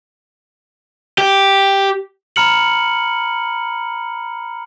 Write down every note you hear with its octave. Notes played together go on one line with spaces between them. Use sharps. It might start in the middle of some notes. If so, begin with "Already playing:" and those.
G4
A#5 B5 F6 C#7 F#7